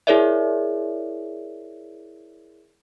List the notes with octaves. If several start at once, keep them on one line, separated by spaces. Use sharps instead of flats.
E4 G#4 A#4 C#5 D5 E5